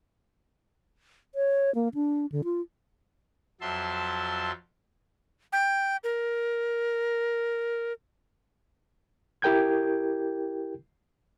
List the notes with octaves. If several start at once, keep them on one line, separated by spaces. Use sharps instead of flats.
C#5
A#3
D4
D3
F4
F2 F#3 E5 A5 C6
G5
A#4
E4 G4 A#4 G5 G6 G#6